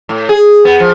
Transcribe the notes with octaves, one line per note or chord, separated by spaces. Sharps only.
A2
G#4
B3
F3